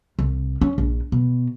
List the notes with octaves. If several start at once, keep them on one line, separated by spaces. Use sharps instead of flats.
C2
C#4
A#1
B2